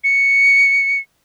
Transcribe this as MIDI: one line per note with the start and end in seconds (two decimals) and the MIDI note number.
0.04 0.99 97